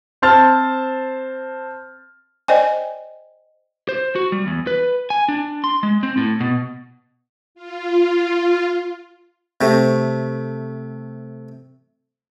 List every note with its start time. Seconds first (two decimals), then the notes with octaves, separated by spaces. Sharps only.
0.22 C4 C5 A5 F6 A6
2.48 C5 D5 D#5 G5 G#5
3.89 C5
4.16 F#4
4.32 G3
4.47 E2
4.67 B4
5.10 G#5
5.28 D4
5.64 C6
5.83 G#3
6.03 C4
6.17 A2
6.40 B2
7.55 F4
9.61 C3 A3